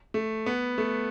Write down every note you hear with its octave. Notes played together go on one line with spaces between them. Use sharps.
A3
B3
A3